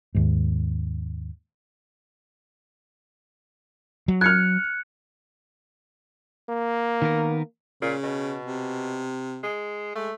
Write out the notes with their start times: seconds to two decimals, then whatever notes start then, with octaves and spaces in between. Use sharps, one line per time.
0.15 D#2 G#2
4.08 F#3
4.21 F6 F#6 G#6 C#7
6.49 A#3
7.02 D#3 B3 A#4
7.82 A#2 C#3
8.03 B2
8.45 C3
9.43 G#3
9.95 G#3 A3